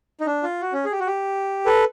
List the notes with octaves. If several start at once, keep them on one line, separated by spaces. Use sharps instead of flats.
D#4
D4
F4
F#4
C#4
G#4
G4
F#4
G4
A4 B4